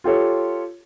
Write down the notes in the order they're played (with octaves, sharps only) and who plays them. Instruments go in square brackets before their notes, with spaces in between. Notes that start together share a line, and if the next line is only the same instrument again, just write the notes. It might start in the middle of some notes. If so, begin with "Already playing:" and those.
[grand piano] F4 G4 A4 C#5